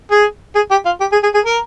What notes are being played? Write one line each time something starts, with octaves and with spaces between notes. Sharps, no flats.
G#4
G#4
G4
F4
G4
G#4
G#4
G#4
A#4